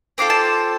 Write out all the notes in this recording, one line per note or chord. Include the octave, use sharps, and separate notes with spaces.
C4 F4 A4 D6
A5